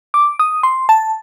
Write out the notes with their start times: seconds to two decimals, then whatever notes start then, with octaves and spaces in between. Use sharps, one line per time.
0.14 D6
0.39 D#6
0.63 C6
0.89 A5